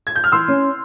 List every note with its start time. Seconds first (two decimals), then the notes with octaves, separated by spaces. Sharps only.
0.07 G#6
0.16 G6
0.24 F6
0.32 E3 C6 E6
0.48 C#4